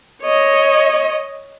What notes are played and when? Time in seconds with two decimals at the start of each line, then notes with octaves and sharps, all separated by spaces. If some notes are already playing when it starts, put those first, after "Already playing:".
0.23 C#5 D#5